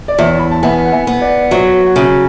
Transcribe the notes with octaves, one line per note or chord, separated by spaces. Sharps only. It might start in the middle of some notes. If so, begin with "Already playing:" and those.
D5
E2 C#5 E5
B5
A5
B3 E5 G#5
F#5
E5 G#5
B3
D5 F#5
D5
F#3 C#5 E5
B4
C#5
F#5
C#3 C#5 E5